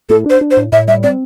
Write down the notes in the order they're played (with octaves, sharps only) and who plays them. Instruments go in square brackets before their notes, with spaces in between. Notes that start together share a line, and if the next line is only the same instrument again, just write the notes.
[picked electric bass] A2 [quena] A4
[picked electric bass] D4 [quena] C5
[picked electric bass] D4
[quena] C5
[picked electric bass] A2
[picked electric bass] A2 [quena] E5
[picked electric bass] G3 [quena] E5
[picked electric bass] C4 [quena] D5